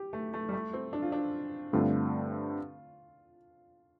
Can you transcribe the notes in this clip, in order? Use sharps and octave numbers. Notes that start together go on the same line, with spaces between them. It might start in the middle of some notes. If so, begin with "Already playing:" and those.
Already playing: G4
A3
A3
G3
A3
C4
D4
F4
D4
G2 D3 A3 C4 F4